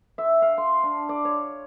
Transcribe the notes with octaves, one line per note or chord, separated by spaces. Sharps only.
E5
F5
C6
D4
D5
C#5